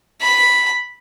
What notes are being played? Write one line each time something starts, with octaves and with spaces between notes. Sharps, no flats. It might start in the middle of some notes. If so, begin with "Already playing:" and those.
B5